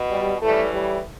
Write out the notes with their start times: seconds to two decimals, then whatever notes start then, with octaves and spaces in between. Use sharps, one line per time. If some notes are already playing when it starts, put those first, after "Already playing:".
Already playing: B2
0.10 G3
0.41 A2 E3 G3 A3
0.70 G3